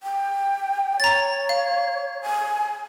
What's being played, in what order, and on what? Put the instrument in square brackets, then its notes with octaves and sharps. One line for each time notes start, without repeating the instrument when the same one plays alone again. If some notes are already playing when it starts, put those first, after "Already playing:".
[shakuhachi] G5
[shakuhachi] C#5 [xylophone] A#5 A6
[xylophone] F5
[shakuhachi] G#5